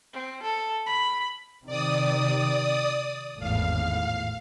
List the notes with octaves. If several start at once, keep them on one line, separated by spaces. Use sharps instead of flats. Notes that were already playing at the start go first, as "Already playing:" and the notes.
C4
A4
B5
C3 D#3 D5 D#6
G#1 E2 A2 F5